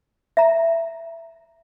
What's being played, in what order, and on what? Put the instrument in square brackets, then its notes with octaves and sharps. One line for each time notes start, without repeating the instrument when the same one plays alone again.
[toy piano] E5 A#5